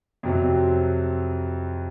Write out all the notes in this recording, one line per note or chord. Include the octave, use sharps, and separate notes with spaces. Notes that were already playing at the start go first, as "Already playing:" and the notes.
F2 C3 F#3 C4